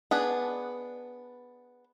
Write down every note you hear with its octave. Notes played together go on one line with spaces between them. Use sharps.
B3 D4 G#4 B4 A5